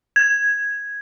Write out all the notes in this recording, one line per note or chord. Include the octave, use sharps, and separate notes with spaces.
G#6